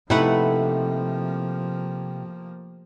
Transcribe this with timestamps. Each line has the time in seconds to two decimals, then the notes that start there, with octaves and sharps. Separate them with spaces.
0.10 C3 F3 A3 A#3 D#4 E4 B4 F#5